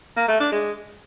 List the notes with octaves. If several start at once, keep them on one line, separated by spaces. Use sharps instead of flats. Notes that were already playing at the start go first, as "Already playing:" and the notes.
A#3
A3
D4
G#3